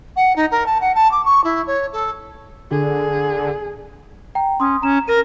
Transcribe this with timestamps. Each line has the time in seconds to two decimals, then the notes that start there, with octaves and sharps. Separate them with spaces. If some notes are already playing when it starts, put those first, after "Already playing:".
0.16 F#5
0.35 D#4
0.51 A#4
0.66 A5
0.81 F#5
0.95 A5
1.11 D6
1.25 C#6
1.44 E4
1.67 C#5
1.92 A4
2.71 D3 G#4
4.35 G5 A#5
4.60 C#4 C6 D#6
4.82 C#4 A#5 E7
5.08 A#4 A#6 D#7